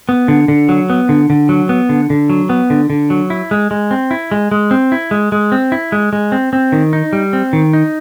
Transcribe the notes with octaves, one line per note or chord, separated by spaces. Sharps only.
B3
D3
D3
F#3
B3
D3
D3
F#3
B3
D3
D3
F#3
B3
D3
D3
F#3
E4
G#3
G#3
C4
E4
G#3
G#3
C4
E4
G#3
G#3
C4
E4
G#3
G#3
C4
C4
D#3
D#4
G3
C4
D#3
D#4